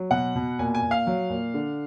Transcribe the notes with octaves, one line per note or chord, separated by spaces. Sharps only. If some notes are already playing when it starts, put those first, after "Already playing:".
Already playing: F#3
B2 F#5
B2
A#2 G#5
G#5
A#2
F5
F#3
A#2
D3